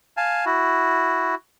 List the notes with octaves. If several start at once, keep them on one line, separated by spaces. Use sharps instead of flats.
F5 G#5 A5
E4 F#4